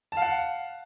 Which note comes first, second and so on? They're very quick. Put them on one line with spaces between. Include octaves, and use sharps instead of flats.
A5 F5 F#5